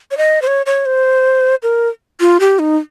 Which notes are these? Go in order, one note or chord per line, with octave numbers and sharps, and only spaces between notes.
C#5
D#5
C5
C#5
C#5
C5
A#4
F4
G4
D#4